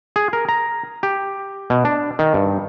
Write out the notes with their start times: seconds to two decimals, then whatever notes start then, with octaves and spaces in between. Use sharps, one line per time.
0.16 G#4
0.33 A#4
0.49 A#5
1.03 G4
1.70 B2
1.85 D4
2.19 D#3
2.34 G2